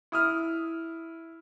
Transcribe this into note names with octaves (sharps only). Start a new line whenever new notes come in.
E4 D#6 F6